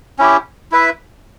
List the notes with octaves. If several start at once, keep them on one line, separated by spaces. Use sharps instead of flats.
C#4 E4 G4
E4 B4 E5